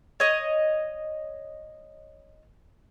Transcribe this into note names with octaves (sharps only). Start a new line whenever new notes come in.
C#5 D#5